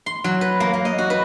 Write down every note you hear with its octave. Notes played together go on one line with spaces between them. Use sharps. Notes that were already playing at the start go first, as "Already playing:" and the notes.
C6
F#3
B4
A#3
A#3
D#5
F#4
B4